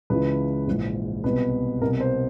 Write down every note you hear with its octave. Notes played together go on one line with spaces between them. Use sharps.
C#2 C#3 E3 B4
A#1 G#2 E3
C2 B2 B4
C2 B2 A#4
C5